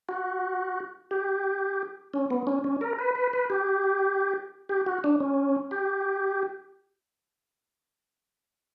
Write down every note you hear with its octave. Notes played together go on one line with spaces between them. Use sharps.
F#4
G4
C#4
B3
C#4
C#4
A#4
B4
B4
B4
G4
G4
F#4
D4
C#4
G4